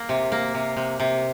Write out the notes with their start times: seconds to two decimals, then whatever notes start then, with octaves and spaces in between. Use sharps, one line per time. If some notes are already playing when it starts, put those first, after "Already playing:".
Already playing: A#3
0.09 C3
0.32 A#3
0.54 C3
0.77 C3
1.00 C3